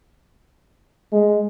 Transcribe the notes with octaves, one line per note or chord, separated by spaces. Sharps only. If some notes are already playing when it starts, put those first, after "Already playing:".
G#3